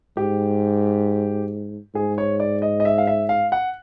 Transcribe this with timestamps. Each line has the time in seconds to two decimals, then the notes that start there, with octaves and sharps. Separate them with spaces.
0.17 G#2 G4
1.95 G#2 G#4
2.18 C#5
2.40 D5
2.62 D#5
2.80 D#5
2.85 E5
2.98 F5
3.07 E5
3.29 F5
3.52 F#5